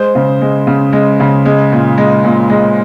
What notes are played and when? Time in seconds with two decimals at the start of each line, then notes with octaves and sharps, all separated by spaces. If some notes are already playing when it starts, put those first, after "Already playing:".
Already playing: G#3 C5
0.15 C#3
0.41 G#3
0.67 C#3
0.93 G#3
1.20 C#3
1.45 G#3
1.72 A#2
1.98 G#3
2.24 A#2
2.50 G#3